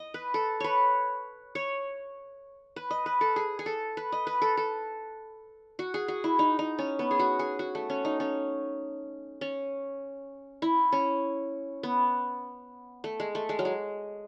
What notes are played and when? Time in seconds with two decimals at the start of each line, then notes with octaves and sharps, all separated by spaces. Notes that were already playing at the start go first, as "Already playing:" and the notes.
Already playing: D#5
0.14 B4
0.34 A4
0.60 B4 C#5
1.55 C#5
2.76 B4
2.91 D#5
3.06 B4
3.21 A4
3.36 G#4
3.59 G#4
3.66 A4
3.97 B4
4.12 D#5
4.27 B4
4.42 A4
4.57 A4
5.79 F#4
5.94 G#4
6.08 F#4
6.24 E4
6.39 D#4
6.59 D#4
6.79 C#4
6.99 B3
7.11 G#4
7.19 F#4
7.39 G#4
7.59 F#4
7.75 A3
7.90 C#4
8.05 D#4
8.20 C#4
9.41 C#4
10.62 E4
10.92 C#4
11.83 B3
13.04 A3
13.20 G#3
13.35 A3
13.49 G#3
13.59 F#3
13.65 G#3